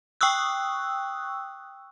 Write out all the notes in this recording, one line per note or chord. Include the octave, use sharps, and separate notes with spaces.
G5 C#6 D#6 E6 F#6